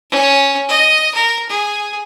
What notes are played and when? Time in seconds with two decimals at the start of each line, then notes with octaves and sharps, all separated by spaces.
0.11 C#4
0.69 D#5
1.14 A#4
1.49 G#4